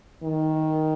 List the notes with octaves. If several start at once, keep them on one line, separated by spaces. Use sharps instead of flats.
D#3